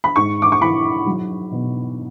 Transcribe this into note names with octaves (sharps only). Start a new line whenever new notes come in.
B5
G#2 C#6
D6
C#6
E3 B5
F#3
B2